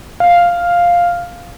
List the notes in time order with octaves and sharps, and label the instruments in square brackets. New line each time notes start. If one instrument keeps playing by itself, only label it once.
[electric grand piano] F5